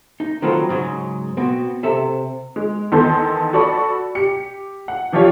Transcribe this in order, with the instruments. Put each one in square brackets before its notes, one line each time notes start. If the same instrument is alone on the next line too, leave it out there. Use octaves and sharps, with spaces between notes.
[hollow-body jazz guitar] D#4
D#3 F#3 C4 F4 A4 B4
G#2 C#3 F#3 G#3
B2 B3 C4
C3 A4 E5
[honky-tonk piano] G#3
E2 D#3 B3 A4 C6 G6
F#4 A4 D5 B5 C#6
G4 C#7
F#5
E3 F3 F4 G4 C#5